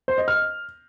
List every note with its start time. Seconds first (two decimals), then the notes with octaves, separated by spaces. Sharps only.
0.08 C5
0.18 D#5
0.28 F6